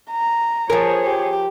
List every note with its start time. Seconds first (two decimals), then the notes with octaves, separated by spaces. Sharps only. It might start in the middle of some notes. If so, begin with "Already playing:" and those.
0.11 A#5
0.70 F3 G#4 A#4 C#5
1.05 G4